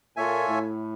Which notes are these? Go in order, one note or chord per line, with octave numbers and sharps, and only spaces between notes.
A#2 F4 A4 C#5 E5 G#5
A2